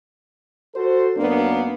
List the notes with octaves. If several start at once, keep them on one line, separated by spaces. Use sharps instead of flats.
F#4 A4 C5
F#2 A#3 B3 D4